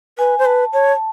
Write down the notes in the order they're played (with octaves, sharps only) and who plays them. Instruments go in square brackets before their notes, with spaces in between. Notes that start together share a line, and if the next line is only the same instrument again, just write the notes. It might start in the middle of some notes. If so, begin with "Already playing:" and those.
[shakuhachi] B4 [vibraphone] G#5
[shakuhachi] C5
[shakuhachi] B4 [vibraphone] A5
[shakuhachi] C#5 [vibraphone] A5